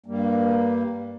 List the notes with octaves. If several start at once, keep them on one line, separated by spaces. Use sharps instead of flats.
G2 G3 A#3